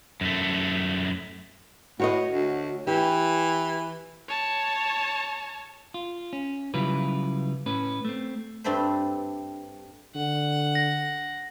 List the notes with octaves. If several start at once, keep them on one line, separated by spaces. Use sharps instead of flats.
F#2 A3
A2 F#4 C#5 D#5
D2
E3 G4
C#5 A5
F4
C#4
C#3 F#3 G3 E4 F4 B4
A2 C#4 B4
A3 C4
G2 A3 C4 D4 B4 C5
D3 F#5
A#6